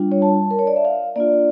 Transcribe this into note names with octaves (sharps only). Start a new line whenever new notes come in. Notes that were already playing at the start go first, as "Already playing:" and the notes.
Already playing: G3 D4 F4
C#5
A5
A#4
C#5
D5
E5
F5
A#3 D4 F4 D5